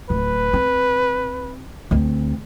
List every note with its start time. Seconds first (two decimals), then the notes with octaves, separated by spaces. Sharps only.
0.10 D1 B4
0.53 C4
1.91 D2 C4